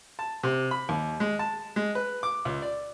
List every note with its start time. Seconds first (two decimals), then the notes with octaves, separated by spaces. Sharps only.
0.19 A5
0.43 C3
0.71 B5
0.89 D#2
1.20 G#3
1.39 A5
1.76 G#3
1.95 B4
2.23 D6
2.45 C#2
2.62 D5